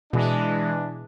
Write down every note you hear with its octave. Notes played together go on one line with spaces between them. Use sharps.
B2 E3 G#3 D4